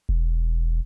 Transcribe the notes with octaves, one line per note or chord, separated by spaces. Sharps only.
E1